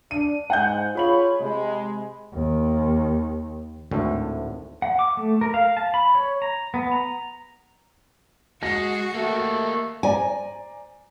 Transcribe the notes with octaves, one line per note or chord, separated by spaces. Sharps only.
D4 D#7
G#2 F#5 G#5 G6
F4 G#4 C#5 B5 F#7
C3 G#3
D#2
G#1 D2 A2
F#5
D6
A3
A#4
F5
A5
B5
C#5
A#5
B3
A#5
G#3 F#4 A#6
A3 A#3 G4
C5 D5 G#5 A#5